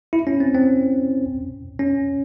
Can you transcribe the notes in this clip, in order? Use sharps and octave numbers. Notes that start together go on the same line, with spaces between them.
E4
C#4
C4
C4
C#4